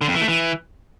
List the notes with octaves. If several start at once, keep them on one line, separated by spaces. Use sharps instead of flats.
D3
F2
E3
A3
E3